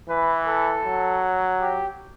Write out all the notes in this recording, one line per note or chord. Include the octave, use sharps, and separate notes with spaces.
E3 B4
A4
F#3
G4